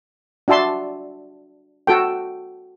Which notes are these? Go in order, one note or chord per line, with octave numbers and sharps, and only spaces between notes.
D4 F#4 E5 A5 C6
F#4 A4 G5